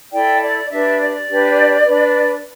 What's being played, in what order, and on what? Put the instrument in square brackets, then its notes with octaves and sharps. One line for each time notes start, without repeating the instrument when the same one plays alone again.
[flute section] E4 A4 D5 G5
D5
D4 G4 B4 E5
D5
D4 G4 B4
D4 B4